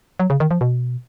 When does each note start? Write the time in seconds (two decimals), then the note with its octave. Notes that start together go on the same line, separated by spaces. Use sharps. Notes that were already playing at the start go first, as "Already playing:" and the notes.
0.20 F#3
0.30 C#3
0.40 D#3
0.51 F3
0.61 B2